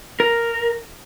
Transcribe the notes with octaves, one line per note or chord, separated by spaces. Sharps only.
A#4